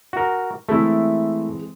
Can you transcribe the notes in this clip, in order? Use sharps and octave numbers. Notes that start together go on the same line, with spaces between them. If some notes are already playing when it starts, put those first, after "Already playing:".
F#4 A#4
E3 G#3 A3 C4 E4